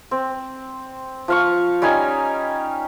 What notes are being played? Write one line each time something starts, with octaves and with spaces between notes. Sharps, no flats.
C4
F3 F5 C#6
G3 C#4 D#4 G#5